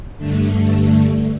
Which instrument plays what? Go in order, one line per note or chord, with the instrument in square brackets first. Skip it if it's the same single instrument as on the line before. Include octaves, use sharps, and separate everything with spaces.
[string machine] G2 D3 A3